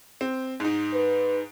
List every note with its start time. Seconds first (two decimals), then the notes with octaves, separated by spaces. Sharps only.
0.21 C4
0.60 G#2 D#4
0.94 B4